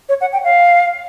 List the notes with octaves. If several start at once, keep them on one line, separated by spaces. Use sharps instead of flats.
C#5
F#5
G5
F5